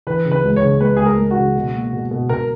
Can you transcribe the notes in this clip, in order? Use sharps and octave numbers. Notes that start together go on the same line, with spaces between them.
E3 B4
C#3
B4
C#2
C#5
C#3
G#3 B4
C#2 G#4
A#4
G#3
F#4
C#3
B2
A#3
B2
B2
B2 A#4